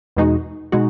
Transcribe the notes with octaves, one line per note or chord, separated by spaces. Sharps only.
E2 B2 G#3 D#4 F#4
B2 G#3 D#4 F#4